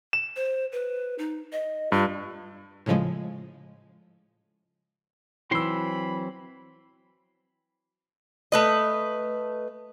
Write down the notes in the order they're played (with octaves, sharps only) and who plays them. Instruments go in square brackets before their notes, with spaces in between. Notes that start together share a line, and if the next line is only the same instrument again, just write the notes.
[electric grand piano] E7
[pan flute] C5
B4
D#4
D#5
[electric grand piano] G2 [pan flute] F4
[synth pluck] A2 C#3 F3 G#3
[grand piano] E3 E6 [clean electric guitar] F#3 C4 C6 [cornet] B5
[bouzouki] A3 B4 D#5